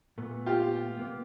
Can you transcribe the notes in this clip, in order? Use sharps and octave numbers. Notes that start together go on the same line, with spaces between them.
A#2 A3 B3
F4 G4
C3 A#3 B3